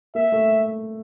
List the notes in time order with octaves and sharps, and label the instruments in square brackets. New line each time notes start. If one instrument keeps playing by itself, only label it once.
[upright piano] A#3 [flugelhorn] E5
[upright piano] A3